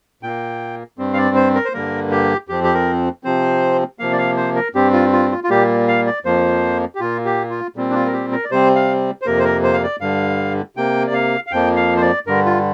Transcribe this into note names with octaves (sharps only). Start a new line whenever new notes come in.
A#2 A#3 G5
G2 G3 C4
F5
D5
C5
A#4
C5
G2 D3 G3 A#3 A#4
G4
F2 F3 C4 G4
G4
A#4
C3 F3 C4 C5
C3 F3 A#3 F5
D5
F5
C5
A#4
G2 G3 C4 G4
F4
F4
F4
F4
A#2 G3 A#3 G4
F5
D5
F2 F3 A#3 C5
G4
A#2 A#3 F4
G4
F4
A#2 G3 C4
D4
F4
A#4
G4
A#4
D5
C3 G3 C4 C5
F5
C5
F2 C3 A#3 A#4
C5
A#4
C5
F5
D5
G2 D3 G3 F5
C3 A#3 G5
D5
F5
F5
F2 F3 A#3 G5
F5
C5
D5
G2 D3 G3 A#4
F4